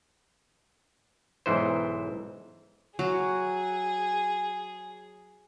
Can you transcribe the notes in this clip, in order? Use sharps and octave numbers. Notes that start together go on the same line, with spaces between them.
B1 G#2 E3 C5
F#3 F#4 G#4